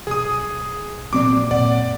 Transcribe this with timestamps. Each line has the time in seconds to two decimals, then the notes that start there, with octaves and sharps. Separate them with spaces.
0.07 D1 B1 G#4 D#6
1.13 A#1 F#3 A#3 C4 D5 D6
1.51 F#2 A#2 D5 F#5